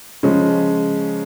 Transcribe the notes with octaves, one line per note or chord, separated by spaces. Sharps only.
C#3 F3 G#3 C#4